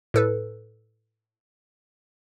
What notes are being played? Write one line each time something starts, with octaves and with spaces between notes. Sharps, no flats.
A2 A4 B4